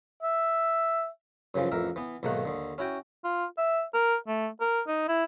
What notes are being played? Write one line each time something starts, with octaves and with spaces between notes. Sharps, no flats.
E5
F#2 C#3 E3 F3
A1 F2 A#4 E5
E3 B3
B1 G#2 D#3 A3 A#3 F#5
D#2 D3
C#4 E4 F#4 G5 G#5
F4
E5
A#4
A3
A#4
D#4
E4